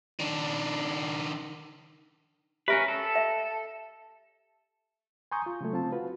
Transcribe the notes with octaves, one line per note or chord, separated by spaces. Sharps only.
D#3 D4
C#4 G4 A#4 B4 E5 B5
A4
E5
G#5 A#5 C6 C#6 D#6 G6
F4
C#3 F#3 A3
C4 F4 A5
F4 F#4 B4